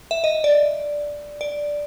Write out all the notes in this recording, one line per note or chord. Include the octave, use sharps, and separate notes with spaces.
E5
D#5
D5
D5